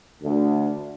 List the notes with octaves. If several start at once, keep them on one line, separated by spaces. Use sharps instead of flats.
D2